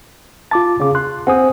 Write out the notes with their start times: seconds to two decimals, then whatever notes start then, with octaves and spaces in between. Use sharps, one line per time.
0.51 F4 A5 D6 A6
0.80 C#3 C#4 F5 D6
0.95 C6 F#6
1.27 C4 F#5 G#5 D#6